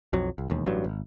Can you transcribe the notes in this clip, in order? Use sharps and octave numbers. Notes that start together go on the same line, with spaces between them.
B1 F2 F#3
C2
E1 D#2
A1 G2 F#3
G#1